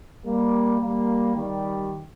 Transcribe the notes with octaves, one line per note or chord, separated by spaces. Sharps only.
G3 A#3
G3 A#3
D#3 G3